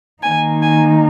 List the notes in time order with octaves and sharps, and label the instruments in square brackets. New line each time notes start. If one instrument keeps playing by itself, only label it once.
[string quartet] D#3 A#3 D#4 G#5
G#5